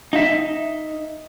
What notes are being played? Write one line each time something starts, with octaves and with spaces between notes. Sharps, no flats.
D#4 E5